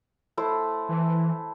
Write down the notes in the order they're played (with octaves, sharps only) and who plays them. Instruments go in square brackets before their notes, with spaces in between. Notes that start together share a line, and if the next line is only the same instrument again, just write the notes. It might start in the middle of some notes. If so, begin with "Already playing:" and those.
[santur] A3 E4 C5
[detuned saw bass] E3